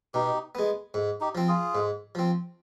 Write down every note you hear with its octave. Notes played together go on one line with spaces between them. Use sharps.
B2 D#4 G4
G#3 B3
G#2
D#4 G4
F3 C4
F4 G#4
G#2
F3 C4